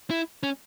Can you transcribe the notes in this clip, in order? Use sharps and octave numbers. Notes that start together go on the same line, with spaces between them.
E4
C#4